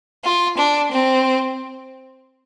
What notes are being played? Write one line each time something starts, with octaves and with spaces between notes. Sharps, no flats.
F4
D4
C4